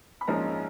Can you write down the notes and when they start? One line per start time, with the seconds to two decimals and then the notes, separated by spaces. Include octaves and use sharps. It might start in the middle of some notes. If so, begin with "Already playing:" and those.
0.21 B5
0.27 A#1 G#2 F3 G#3 C#4 A#4 A#5